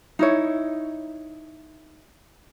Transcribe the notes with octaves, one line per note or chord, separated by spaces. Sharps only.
D#4 E4 C#5